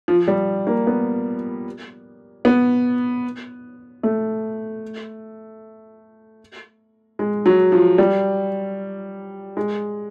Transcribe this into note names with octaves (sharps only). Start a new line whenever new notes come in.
F3
G3
A#3
B3
B3
A3
G#3
F#3
F3
G3
G#3